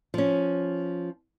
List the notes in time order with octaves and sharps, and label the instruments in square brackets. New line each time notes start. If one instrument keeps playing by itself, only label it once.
[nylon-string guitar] F3 C#4